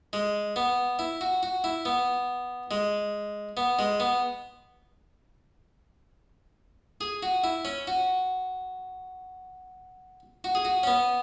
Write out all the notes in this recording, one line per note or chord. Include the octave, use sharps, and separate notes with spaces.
G#3
B3
E4
F#4
F#4
E4
B3
G#3
B3
G#3
B3
G#4
F#4
E4
C#4
F#4
F#4
G#4
F#4
C#4
B3